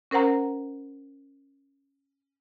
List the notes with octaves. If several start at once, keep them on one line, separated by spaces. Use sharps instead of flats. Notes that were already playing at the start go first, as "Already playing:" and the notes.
C#4 A#4 C5 F#5 A#5